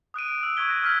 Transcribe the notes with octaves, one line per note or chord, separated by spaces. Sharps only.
D#6 F#6 D7 D#7
D7
E6
C#6 E6 F#6 G#6 B6 G7
F#6 A#6 D#7
E6 F6 G#6 B6